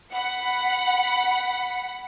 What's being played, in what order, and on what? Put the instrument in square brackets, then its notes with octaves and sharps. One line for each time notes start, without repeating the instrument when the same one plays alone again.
[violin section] F#5 B5